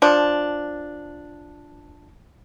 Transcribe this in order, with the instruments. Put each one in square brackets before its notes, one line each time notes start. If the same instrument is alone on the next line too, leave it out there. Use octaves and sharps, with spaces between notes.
[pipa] F3 D4